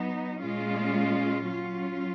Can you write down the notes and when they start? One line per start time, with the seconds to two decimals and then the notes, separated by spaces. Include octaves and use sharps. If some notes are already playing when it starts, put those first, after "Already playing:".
Already playing: F#3 B3 D#4
0.41 A#2 G#3 C#4 F4
1.47 F#3 C#4 F4